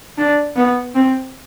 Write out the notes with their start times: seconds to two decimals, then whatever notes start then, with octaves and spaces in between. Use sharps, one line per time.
0.18 D4
0.56 B3
0.95 C4